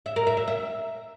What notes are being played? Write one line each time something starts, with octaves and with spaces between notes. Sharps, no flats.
E5
A#4
E5
E5
E5